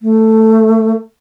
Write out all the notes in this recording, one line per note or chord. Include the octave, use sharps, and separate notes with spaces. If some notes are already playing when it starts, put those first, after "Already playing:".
A3